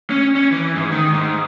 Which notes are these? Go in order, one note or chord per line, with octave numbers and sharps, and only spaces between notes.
C#4
C#4
E3
G#2
D#3
G#2